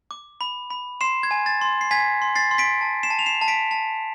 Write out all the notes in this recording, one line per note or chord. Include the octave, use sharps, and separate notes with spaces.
D6
B5
B5
C6 C7 E7
G#6
G#5
A6
C6
C7
G#5 G#6 B6
C6
A6 C7
C6
B6 D7
A5
C7 E7
A5
F7
C7 E7
A5
B6 D7
A5